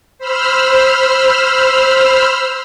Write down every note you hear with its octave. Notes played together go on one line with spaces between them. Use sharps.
C5 B5 E6 F6